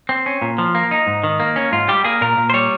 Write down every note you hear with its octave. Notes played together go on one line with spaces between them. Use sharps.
C4
C#4
A#2
F3
A#3
D#4
G#2
D#3
A#3
C#4
G#2 F4
G3 G4
A#3 G#4
A#2 A#4
A#2
C5
G3 C#5